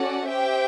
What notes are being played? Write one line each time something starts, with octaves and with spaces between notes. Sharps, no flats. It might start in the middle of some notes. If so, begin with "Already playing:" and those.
Already playing: C#4 F#4 A4 D5 F#5
G4 C5 E5 G5